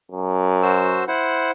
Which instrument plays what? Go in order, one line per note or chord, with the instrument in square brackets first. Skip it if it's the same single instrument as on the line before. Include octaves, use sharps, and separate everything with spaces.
[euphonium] F#2
[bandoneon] F#4 C5 E6
E4 C5 F#5